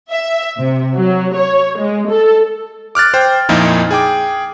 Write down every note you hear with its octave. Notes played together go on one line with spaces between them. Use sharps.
E5
C3
F#3
C#5
G#3
A4
D6 F6 F#6 A6
C5 G5
F2 A#2 F3 A#3 D#4 E4
G#4 G5 D6